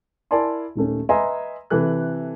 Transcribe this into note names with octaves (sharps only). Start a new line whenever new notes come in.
E4 A#4 D5 G#5 A5 C6
D#1 D#3 A3 C#4
B4 D#5 E5 G#5 A#5 C6
C3 E3 A4 F#6